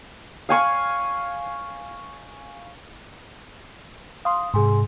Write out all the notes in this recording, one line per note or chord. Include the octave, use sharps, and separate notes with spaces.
F5 G#5 C#6
F5 C6 D#6
G#2 C3 G#4 G#5 C6